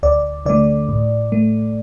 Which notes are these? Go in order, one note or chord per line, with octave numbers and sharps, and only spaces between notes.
D2 D5
D3 A3 D5
A2
A3